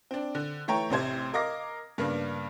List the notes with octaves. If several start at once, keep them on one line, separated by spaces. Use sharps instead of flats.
C4 D4
D3
E3 A3 C#5 G5 A#5
A1 C3 C5 G#6
A#4 D#5 F5 D6 A#6
G2 C#3 A#3 B3 D4